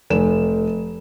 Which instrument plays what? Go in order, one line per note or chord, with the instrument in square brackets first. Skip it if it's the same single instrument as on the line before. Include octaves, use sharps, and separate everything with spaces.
[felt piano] F1 E7